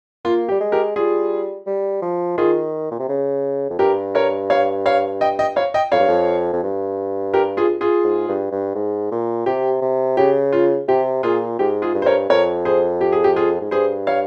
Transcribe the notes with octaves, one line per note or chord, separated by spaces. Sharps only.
A#3 F4
G4
G3
G#3
G4 A#4
G3 F4 G#4
G3
F3
D#3 F4 G#4
A#2
C3
C#3
F2
G2 G4 A#4
A#4 C#5
C#5 F5
C#5 F5
D#5 G5
D#5 G5
C#5 F5
D#5 G5
F2 C#5 F5
G2
F2
F2
G2
G4 A#4
F4 G#4
F4 G#4
G#2
G2
G2
G#2
A#2
C3 G4
C3
C#3 G4
F4
C3 G4
A#2 F4 G#4
G#2 G4
F4 G#4
G2
C5
A#4 C#5
F2 A#4 C#5
G#4 C5
G4
G#4
G4
F4 G#4
G#2
G2 G#4 C5
C#5 F5